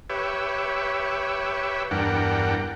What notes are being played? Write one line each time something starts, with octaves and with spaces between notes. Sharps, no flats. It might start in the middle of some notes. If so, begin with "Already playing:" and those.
G4 B4 C#5 E5
E2 G2 D4 A#4 F#5 G5